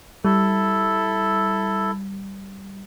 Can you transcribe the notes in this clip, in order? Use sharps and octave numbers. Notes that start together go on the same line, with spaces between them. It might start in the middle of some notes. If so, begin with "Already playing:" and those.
G3 E4 A4